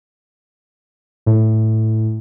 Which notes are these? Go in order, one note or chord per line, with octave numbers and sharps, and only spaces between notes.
A2